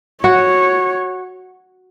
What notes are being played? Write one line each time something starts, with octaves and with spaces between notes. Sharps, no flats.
F#4 C#5